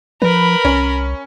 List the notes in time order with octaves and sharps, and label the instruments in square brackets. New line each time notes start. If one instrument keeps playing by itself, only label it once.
[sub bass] F3 [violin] A#4 B5 [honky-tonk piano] B4
[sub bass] C2 [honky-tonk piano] C#4